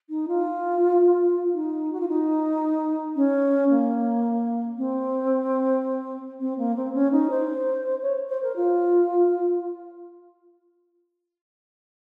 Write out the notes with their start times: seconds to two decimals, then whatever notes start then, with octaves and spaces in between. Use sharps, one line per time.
0.09 D#4
0.28 F4
1.54 D#4
1.92 F#4
2.00 F4
2.08 D#4
3.15 C#4
3.69 A#3
4.77 C4
6.40 C4
6.58 A#3
6.76 C4
6.94 C#4
7.12 D#4
7.30 C5
8.02 C#5
8.29 C5
8.43 A#4
8.56 F4